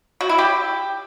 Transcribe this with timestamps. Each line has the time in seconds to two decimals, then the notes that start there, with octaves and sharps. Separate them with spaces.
0.21 F#4
0.29 E4
0.38 G4